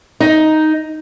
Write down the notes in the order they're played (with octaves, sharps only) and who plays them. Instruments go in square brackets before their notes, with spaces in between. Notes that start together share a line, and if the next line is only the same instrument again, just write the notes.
[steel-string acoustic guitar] D#4